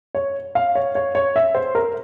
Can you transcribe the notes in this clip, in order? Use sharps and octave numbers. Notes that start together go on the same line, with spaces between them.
C#5
F5
C#5
C#5
C#5
E5
C5
A#4